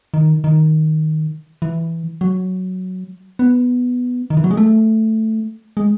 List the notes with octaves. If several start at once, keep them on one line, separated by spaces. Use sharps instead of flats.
D#3
D#3
E3
F#3
B3
D#3
E3
F#3
G#3
A3
G#3